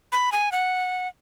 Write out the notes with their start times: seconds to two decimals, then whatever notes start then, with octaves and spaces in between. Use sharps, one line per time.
0.12 B5
0.32 G#5
0.52 F#5